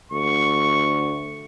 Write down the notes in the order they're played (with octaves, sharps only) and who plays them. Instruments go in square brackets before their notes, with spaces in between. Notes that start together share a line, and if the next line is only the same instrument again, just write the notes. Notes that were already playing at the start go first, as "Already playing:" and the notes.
[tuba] D2 [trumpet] C#6